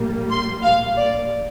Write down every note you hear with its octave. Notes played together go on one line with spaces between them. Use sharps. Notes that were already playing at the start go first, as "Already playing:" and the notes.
Already playing: A#1 A2 G3 A#3
C6
F5
D5